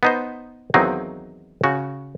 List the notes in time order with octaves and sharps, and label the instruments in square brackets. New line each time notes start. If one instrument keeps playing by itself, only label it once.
[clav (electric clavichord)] B3 D#4 C5
E2 D#3 F#3 A#3 C4 D#4
C#3 F#4